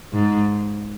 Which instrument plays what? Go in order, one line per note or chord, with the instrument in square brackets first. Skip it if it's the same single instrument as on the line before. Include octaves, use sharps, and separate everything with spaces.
[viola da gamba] G#2